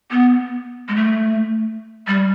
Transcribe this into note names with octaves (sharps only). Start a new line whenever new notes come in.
B3
G#3
A3
G3